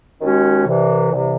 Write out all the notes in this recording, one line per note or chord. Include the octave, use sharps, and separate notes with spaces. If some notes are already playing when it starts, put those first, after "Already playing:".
D#2 D#3 G#3 C#4 F#4
C2 C3 E3
C2 C3 E3